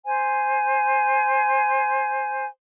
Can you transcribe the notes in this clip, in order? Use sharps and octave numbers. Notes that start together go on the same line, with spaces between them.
C5 G#5